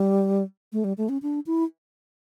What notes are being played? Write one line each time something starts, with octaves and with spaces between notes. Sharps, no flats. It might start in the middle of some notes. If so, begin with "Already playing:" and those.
Already playing: G3
A3
G3
A3
C#4
D4
E4